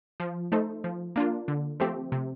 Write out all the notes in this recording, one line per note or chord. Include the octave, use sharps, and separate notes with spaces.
F3
A3 D#4 A4 C5
F3
A#3 D4 F4
D3
F3 A3 C4 G4
C3